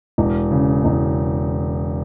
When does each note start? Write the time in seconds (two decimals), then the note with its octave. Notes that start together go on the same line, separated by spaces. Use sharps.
0.18 E1
0.51 C#3
0.85 E1